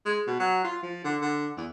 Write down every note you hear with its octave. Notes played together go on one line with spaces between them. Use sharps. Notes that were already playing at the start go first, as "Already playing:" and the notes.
G#3
B2
F#3
F4
F3
D3
D3
E2